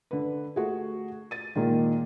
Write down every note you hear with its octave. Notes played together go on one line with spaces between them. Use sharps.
D3 B4
A3 F#4 G#4
A6 D#7
A#2 D#3 G#3 A#3